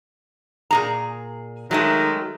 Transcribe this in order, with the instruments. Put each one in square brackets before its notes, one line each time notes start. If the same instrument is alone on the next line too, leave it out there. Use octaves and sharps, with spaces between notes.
[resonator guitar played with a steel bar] A#2 G#4 A#5
[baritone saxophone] D#3 [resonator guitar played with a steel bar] F#3 G#3 A3